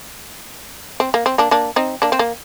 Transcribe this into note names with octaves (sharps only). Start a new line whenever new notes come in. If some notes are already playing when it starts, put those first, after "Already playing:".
C4
A#3
C4
A#3 D4
A#3 D4
C4 D#4
A#3 D4
C4
A#3